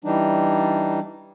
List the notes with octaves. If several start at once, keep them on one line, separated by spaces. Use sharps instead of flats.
E3 G3 D4 D#4